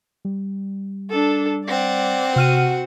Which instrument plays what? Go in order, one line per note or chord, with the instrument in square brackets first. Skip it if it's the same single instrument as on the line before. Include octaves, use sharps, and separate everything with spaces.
[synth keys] G3
[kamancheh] D4 A4
[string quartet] C4 F#5 [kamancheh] D5
[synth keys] C3 F6 D#7 [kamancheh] F#4